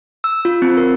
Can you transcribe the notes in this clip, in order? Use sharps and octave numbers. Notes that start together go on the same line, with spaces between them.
E6
F4
C4
A#4